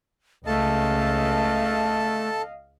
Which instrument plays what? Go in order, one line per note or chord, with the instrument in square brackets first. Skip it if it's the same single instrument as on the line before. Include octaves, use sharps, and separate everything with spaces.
[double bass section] C#2 [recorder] A3 [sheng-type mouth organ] A4 A5 [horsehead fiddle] D#5 F5